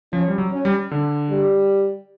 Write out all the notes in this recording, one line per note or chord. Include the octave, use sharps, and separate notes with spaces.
F3 C#4
G3
F#3
C#4
G3
D3
G3